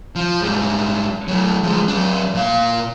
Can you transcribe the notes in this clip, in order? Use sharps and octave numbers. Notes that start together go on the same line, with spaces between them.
F3
G#2 G3
F#3 A3
F3 G#3
F#3 D4
A#2 F5